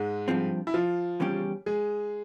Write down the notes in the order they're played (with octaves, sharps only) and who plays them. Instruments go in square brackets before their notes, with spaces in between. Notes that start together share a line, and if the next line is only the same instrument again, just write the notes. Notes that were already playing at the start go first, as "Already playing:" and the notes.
Already playing: [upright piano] G#2 G#3
[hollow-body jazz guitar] G2 F3 C4
[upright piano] E4
F3 F4
[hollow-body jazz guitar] E2 C#3 G3 C#4 G4
[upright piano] G#3 G#4